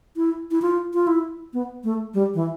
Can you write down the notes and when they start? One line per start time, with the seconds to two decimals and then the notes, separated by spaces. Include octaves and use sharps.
0.16 E4
0.51 E4
0.62 F4
0.94 F4
1.07 E4
1.53 B3
1.84 A3
2.14 G3
2.34 E3